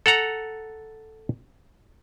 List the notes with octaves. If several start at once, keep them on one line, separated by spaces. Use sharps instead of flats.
A4 F#5 A#5